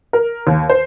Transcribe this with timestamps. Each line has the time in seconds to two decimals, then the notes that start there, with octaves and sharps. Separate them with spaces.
0.13 A#4
0.47 D#2
0.70 C5